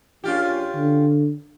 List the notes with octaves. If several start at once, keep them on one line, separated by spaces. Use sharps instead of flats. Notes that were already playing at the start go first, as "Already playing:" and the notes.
A#1 C#4 F4 G4
D3